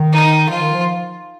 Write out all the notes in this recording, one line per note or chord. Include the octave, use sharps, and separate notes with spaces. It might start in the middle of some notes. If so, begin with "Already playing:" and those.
Already playing: D#3
D#4
F3 F4
D#3
F3